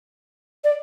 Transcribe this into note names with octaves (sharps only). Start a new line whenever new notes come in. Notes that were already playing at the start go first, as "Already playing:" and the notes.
D5